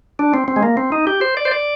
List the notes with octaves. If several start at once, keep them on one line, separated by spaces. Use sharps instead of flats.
D4
C4
C4
G#3
A#3
C4
D#4
G4
C5
D5
C5
D5